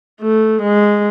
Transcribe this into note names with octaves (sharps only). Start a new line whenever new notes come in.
A3
G#3